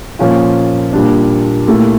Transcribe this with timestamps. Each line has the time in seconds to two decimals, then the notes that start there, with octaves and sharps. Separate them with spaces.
0.19 A#2 F3 C#4 F4
0.93 A#2 G3 D4
1.67 A#2 A3 E4 G4